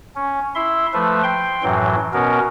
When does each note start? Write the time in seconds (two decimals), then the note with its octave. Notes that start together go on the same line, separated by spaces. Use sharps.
0.16 C#4
0.55 E4 E5 C6
0.94 F3 A3 B4 E5
1.23 G5 C6
1.63 F#2 A2 E3 F#3
2.14 B2 B3 C#4 A#4